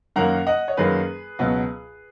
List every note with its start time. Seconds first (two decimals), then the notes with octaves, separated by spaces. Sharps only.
0.16 F#2 D#3 F#3 A#3 F#5 A#5
0.47 D#5 F#5
0.68 C#5
0.77 F#2 D#3 F#3 A#3 G#4 B4
1.39 C#2 B2 F#3 B3